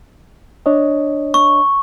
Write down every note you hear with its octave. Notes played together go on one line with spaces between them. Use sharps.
D4 C#5 D#5
C#6